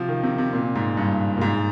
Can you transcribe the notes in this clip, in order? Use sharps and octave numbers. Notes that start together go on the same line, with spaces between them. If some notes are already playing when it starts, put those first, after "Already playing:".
Already playing: C3 F3
D#3
C3
C3
A#2
G#2
G2
A#2
G#2